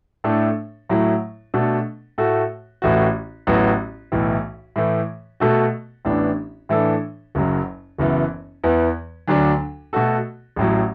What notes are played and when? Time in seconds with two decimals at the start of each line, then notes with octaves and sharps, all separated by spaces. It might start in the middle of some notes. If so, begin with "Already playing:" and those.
0.24 A2 A3 D4 A4
0.89 A2 F#3 A3 E4
1.54 B2 A3 D4 A4
2.18 A2 A3 F#4 A4
2.82 A1 A2 E3 A3 F#4
3.47 A1 A2 F#3 B3 F#4
4.12 B1 A2 E3
4.76 A2 E3 A3
5.40 B2 A3 F#4 A4
6.05 A1 A2 E3 B3 D4
6.69 A2 E3 D4 A4
7.35 F#1 F#2 F#3
7.98 F#1 F#2 E3 B3
8.64 E2 E3 B3
9.28 D2 D3 F#3 D4
9.93 B2 A3 F#4 A4
10.56 A1 A2 F#3